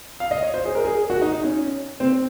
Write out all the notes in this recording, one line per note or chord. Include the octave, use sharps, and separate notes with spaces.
F5
D#5
C#5
C5
G#4
A#4
G#4
F#4
D#4
D#4
C#4
C4